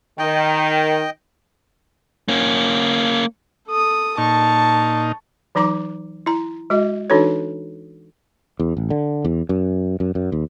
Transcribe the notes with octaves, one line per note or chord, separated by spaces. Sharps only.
D#3 D#5 G5
A#3 C#4
A4 D#6
A#2 D#4 A5 C#6
E3 F#3 D#4 A#5 D6
E4 A#5
G#3 F#4 D#5
E3 D4 D#4 F#4 A4 C#5
E2
A1
D3
E2
F#2
F#2
F#2
D#2